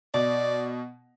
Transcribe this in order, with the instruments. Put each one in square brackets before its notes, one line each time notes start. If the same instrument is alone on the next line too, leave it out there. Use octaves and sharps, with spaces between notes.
[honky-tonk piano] B2 [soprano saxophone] D5